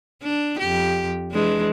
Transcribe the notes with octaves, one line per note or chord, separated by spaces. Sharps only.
D4
F2 G4
E3 G#3 D4